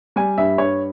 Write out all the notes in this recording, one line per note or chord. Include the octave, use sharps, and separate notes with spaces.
G3 G#5
G2 E5
G2 C#5